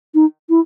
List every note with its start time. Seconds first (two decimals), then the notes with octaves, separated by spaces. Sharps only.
0.14 D#4
0.49 E4